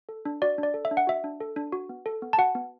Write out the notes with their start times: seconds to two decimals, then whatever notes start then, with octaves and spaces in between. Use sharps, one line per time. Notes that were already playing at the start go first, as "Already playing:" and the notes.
0.09 A4
0.25 D4
0.42 F#4 D5
0.58 D4
0.63 D5
0.74 A4
0.85 E5
0.91 D4
0.97 F#5
1.07 F#4 E5
1.24 D4
1.40 A4
1.56 D4
1.72 F#4
1.89 B3
2.06 A4
2.22 B3
2.33 A5
2.38 F#4 F#5
2.55 B3